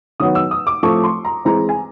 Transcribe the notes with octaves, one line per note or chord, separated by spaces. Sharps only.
D#3 F#3 B3 D#6
E6
D#6
D6
A2 F3 A3 C4 C#6
C6
A#5
E3 G#3 C4 A#5
G#5